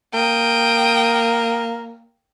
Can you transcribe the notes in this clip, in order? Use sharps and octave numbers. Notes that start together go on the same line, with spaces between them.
A#3 G5 D#6